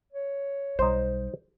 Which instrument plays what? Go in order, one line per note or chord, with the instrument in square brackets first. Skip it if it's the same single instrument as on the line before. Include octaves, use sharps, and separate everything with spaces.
[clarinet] C#5
[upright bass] B1 G3 [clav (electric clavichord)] D#4 C5